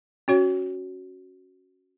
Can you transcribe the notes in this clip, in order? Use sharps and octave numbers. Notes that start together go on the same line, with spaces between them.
C#4 F#4 C#5